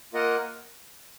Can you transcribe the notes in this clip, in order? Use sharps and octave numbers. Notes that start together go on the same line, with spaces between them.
A#3 F4 A#4 D#5 F#5